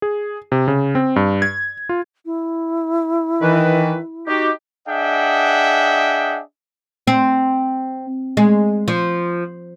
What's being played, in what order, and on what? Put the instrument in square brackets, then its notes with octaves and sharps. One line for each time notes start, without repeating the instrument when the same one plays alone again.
[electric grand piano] G#4
C3
C#3
C4
G2
G#6
F4
[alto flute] E4
[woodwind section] D#3 E3 B4
D#4 F#4 G4
[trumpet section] D4 G#4 D#5 E5 F#5 G5
[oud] C4
G#3
F3